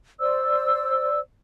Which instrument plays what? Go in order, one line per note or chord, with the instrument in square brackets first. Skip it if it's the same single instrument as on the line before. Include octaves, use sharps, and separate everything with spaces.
[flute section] C5 D5 E6